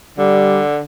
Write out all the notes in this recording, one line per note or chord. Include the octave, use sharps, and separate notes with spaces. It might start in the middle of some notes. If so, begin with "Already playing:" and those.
D3 G3